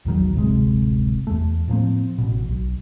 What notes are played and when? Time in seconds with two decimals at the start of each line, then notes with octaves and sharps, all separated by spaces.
0.05 A#1 E2 D#3 F#3
0.34 D1 G1 C3 G#3
1.27 E2 A3
1.68 A2 F3 A#3 C4
2.18 A1 B2
2.48 B1